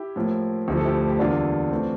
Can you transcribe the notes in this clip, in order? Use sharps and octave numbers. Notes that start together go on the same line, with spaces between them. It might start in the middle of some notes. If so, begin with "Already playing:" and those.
Already playing: E4 G4
A2 F3 A#3
D2 D3 F3 G4
A4
E4 G4
G4
E2 D3 G3 A#3 D4 F4
E3 A3 C4